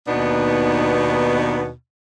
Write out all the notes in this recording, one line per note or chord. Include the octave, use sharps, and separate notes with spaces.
D#2 B2 B3 D4 D#4